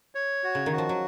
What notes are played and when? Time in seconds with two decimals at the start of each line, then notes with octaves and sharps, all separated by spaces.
0.15 C#5
0.44 F#4
0.55 C#3
0.66 D#3
0.72 F#4
0.78 F3
0.89 F#3